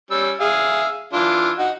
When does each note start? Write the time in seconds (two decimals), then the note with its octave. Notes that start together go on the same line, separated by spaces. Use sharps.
0.11 G3 C#4 E6
0.40 G#4 E5 F5
1.13 E3 D4 F4
1.59 D#4 F#4